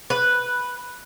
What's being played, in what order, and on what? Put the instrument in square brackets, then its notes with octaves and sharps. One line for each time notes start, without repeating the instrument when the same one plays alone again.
[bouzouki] B4